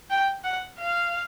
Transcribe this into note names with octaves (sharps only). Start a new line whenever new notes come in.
G5
F#5
F5